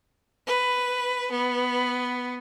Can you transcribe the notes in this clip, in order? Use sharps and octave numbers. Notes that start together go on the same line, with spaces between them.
B4
B3